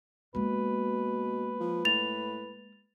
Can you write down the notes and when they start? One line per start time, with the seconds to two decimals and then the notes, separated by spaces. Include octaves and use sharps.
0.35 B2 G#3 A#3 B4
1.60 F3
1.85 A2 A6 F7